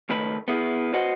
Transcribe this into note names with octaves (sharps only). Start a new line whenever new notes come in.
C#2 D#3 A3 B4 B5
B3 E4 G#4
F#4 B4 C5 D#5 F#5